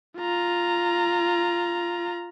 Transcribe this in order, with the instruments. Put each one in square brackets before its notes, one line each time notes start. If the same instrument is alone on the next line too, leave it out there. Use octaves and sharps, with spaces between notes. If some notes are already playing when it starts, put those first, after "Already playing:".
[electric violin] F4 A#5